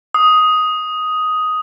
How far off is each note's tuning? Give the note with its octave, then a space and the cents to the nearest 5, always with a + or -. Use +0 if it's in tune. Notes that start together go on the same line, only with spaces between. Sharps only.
D#6 +5